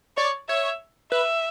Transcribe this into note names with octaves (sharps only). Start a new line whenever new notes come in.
C#5 D5
C#5 E5
B4 E5